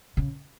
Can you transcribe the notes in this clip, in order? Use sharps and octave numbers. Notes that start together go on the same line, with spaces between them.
C#3